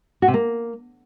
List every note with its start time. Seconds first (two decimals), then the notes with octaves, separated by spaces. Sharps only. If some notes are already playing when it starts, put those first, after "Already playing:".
0.22 F#4
0.28 C3
0.34 A#3